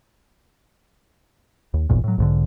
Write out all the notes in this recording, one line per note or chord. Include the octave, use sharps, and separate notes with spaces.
D#2
D1 G#1 E2 A#2
A2 F#3
B1 G#2 D3